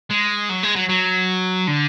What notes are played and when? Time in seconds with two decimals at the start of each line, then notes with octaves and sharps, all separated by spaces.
0.10 G#3
0.49 F#3
0.63 G#3
0.76 F#3
0.89 F#3
1.68 D3